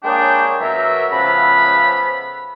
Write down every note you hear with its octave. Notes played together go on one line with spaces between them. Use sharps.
G#3 A#3 D4 G#4 C#5 G5
B2 F#3 A#4 E5
C#3 F3 A3 B3 F5 B5